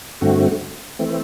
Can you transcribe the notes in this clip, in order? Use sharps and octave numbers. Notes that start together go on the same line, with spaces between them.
G2 D3 A3 C4 F#4
E3 A3 C4